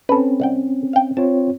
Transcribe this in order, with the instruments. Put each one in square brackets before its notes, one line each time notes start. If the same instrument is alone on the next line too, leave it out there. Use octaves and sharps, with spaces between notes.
[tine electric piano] C4 C#4 [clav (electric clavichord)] A4 B4
[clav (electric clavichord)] C2 F#5 G5
F5 G5
[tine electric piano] C4 F4 C#5 [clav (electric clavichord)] A5